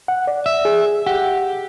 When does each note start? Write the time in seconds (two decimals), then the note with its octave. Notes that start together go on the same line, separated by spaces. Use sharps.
0.08 F#5
0.27 D5
0.46 E5
0.65 G#4
1.06 G4 F#5